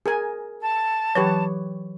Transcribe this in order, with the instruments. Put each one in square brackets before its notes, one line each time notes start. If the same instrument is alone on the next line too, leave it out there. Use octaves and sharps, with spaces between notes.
[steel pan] G#4 A#4 G#5
[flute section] A5
[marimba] E3 F#3 [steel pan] G4 B4 C#5